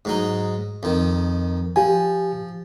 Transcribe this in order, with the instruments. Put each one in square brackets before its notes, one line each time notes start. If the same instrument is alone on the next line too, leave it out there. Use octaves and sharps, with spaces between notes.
[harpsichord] G#2 F#3 D#4
F2 D#3
[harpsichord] F3 [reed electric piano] G4 G#5